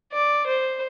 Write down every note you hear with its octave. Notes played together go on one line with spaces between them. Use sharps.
D5
C5